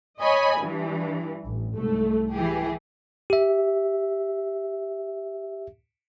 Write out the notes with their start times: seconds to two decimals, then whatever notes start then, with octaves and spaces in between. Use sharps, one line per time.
0.20 C#5 D#5 G#5 B5
0.59 G2 E3
1.46 A1
1.75 C2 G#2 A3
2.33 E3 G4 G#4
3.30 G4 E5